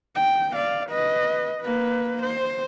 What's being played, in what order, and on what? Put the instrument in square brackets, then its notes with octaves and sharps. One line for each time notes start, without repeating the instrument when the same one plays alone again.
[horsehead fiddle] G5
D5 F5
B4 D#5
A#3 B4
C5